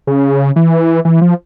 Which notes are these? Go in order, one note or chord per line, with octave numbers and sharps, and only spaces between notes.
C#3
E3
E3
F3